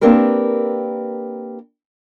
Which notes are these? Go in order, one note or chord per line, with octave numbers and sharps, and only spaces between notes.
A#3 C4 D4 G4 A#4 B4